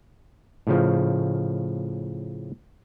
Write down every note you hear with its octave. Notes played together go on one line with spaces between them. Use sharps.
A2 C#3 F3